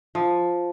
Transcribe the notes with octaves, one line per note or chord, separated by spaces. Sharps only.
F3